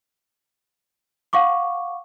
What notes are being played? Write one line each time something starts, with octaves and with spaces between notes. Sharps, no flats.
F5 F#5 C#6 D6